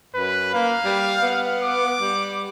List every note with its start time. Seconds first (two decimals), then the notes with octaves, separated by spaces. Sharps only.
0.15 F#2 B4
0.54 A#3 F5
0.85 G3
1.22 B3
1.62 D6
2.00 G3